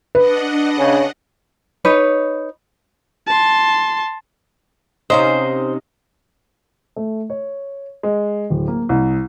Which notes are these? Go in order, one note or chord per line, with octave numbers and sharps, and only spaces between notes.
D4 B4 D#5 F#5
C#3
D#4 B4 C#5
A5 C6
C3 C#4 D#4 C5 D#5 F5
A3
C#5
G#3
D1
A#3
C2